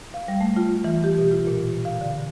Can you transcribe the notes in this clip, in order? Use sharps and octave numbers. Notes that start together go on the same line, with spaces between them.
F5
G3
A3
F4
E3
G4
B2
F4
A#2
F5
D3